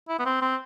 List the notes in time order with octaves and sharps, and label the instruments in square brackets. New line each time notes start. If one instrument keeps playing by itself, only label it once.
[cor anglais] E4
B3
C4
C4